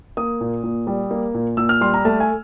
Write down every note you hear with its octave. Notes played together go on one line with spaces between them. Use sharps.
A#3 D#6
A#2
A#2
G3
A#3
A#2
A#2 E6
F6
G3 C6
A#5
A3 A5
G#5